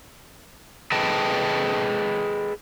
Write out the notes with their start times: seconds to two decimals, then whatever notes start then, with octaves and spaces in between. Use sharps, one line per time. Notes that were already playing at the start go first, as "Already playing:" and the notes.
0.92 G#4 A4 B4 D#5 G5 A5